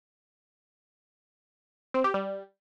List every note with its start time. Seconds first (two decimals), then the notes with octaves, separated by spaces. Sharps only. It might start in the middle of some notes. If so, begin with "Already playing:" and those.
1.94 C4
2.04 G4
2.14 G3